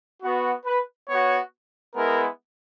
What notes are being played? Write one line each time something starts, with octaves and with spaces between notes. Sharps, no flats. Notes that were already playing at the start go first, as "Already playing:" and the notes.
B3 F#4
B4
B3 F#4 C#5
G#3 B3 E4 A#4